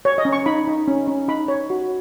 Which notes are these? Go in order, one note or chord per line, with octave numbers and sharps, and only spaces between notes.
C#5
D#5
C#4
C#6
D#4 B5
D#4
C#4
C#4
D#4 B5
C#5
F#4